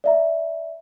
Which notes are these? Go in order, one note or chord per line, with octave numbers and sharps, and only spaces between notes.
D5 E5 A#5